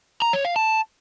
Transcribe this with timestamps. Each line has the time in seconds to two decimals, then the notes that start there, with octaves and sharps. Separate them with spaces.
0.22 A#5
0.33 C#5
0.45 F5
0.56 A5